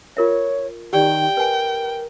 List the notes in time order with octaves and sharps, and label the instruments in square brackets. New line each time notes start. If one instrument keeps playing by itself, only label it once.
[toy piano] F4 A#4 E5 [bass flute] C#5
[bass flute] D#3 [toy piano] G4 D5 [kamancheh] G5
[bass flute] A#4 [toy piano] B4 G#5